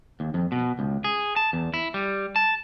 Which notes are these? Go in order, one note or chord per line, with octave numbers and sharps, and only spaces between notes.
D#2
F2
B2
C#2
G#4
A5
E2
E4
G3
A5